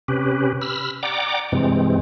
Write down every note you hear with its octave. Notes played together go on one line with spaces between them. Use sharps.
C3 C#4 G4 B4
B5 E6 F6
D5 F#5 G5 A#5 D6
G2 C3 E3 G#3 C4